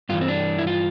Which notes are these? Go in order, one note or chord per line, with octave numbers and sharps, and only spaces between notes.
G2 E3 F4
C4
D4
E4
F4